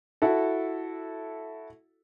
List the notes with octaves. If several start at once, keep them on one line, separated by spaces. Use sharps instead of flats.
E4 F#4 A4